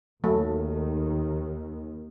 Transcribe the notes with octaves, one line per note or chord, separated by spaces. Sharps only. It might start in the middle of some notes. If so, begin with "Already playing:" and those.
D#2 D#3 F#3 A3